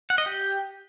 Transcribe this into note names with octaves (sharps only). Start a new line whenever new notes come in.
F#5
D#5
G4